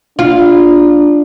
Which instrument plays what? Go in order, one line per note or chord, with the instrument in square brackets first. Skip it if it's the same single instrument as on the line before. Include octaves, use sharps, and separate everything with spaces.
[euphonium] D4 [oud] F4